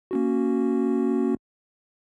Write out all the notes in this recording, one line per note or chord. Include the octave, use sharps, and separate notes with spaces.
A#3 C#4 F#4